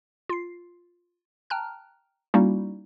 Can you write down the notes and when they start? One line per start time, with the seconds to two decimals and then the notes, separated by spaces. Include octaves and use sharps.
0.29 F4 C7
1.50 G5 A5 A#5 F6 F#6
2.34 G3 A#3 C#4 D#4 E4 F#4